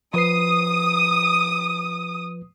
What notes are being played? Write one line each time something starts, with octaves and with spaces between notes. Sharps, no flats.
F3 B4 D#6 C7